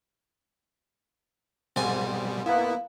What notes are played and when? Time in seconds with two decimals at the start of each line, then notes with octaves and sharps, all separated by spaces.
1.76 C2 G#2 B2 G3 G#5
2.46 A#3 B3 E4 F5